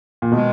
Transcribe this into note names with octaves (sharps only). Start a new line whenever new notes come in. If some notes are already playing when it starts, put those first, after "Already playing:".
A#2
B2 D#3 G#3